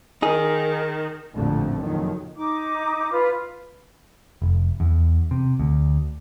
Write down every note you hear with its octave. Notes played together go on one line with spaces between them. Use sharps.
D#3 D#4 G#4
A1 F2 A#2 D3 A3
F#1 F2 D#3 F#3
D#4 D6
F4 B4
F1
E2
C3
D2